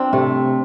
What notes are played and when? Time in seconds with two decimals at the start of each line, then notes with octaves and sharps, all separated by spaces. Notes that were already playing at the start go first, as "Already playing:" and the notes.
Already playing: C4 D4 F4
0.13 C3 A3